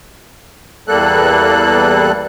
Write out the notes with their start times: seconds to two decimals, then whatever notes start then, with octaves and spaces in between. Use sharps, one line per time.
0.88 E2 G3 A#3 A4 F#6